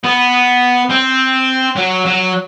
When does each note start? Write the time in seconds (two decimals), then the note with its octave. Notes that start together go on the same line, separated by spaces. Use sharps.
0.05 B3
0.90 C4
1.76 F#3
2.06 F#3